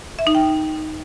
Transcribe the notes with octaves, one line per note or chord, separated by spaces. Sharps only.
E5
D#4
G5